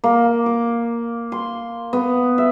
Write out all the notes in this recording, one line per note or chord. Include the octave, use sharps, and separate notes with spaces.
A#3
D6
C6
B3
E5